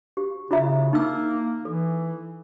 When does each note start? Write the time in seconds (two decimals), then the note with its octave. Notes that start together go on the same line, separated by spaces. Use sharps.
0.17 G4
0.51 C#3 E4 F4 E5
0.93 A#3 D#4 E6
1.65 E3 A4